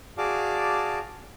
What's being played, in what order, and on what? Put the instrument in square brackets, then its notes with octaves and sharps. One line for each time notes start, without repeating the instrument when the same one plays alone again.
[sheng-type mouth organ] F#4 G#4 D5 F5 A5 D6